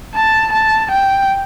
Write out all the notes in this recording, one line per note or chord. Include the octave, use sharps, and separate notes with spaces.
A5
A5
G5